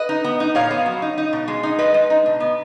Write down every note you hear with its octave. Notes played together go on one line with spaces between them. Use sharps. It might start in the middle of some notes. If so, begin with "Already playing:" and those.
Already playing: B4 D#5
D#4
B3
D#4
A#2 C#5 F5
B3
F#3
D#4
D#4
B2
G#3
D#4
G#3 B4 D#5
G#3
D#4
B2
B3